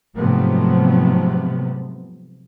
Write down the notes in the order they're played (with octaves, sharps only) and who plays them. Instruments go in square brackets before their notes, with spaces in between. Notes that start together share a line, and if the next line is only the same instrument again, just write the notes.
[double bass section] G#2 C3 F3 F#3 A3 B3